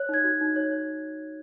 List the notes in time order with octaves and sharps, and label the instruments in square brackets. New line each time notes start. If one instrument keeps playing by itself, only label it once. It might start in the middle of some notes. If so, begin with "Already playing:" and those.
Already playing: [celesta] C#5 F#6
D#4 G#6
F#4
D#4
C#5